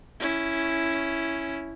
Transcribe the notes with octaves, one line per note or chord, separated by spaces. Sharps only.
C#4 E4